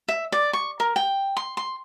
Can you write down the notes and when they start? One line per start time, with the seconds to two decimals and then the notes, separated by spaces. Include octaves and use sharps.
0.08 E5
0.32 D5
0.53 C#6
0.80 A#4
0.96 G5
1.37 C6
1.57 C6